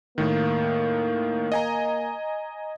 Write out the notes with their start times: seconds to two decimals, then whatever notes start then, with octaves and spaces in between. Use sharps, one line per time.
0.18 A2 D#3 A#3
1.52 D#5 G#5 A#5